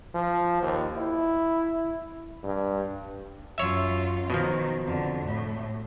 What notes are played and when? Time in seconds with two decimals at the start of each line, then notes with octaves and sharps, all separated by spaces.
0.14 F3
0.62 D#2
0.97 E4
2.43 G2
3.58 F#2 F4 C#5 E5
4.30 B2 D#3 F3
4.85 F2 D3
5.25 A2